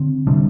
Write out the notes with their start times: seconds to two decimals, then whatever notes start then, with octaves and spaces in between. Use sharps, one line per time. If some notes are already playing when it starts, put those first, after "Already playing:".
Already playing: D3 C4
0.27 C3 G3 D4